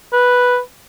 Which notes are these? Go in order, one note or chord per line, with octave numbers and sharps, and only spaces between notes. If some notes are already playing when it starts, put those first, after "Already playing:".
B4